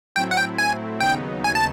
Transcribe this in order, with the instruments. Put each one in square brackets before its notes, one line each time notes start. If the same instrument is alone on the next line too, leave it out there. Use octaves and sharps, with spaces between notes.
[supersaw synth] A2 F#3 A3 C4 E4 [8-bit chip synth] G5
[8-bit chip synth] F#5
G5
G#5
[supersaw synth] D#2 C#3 F#3 B3 D#4 [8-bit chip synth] G5
[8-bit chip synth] G#5
A5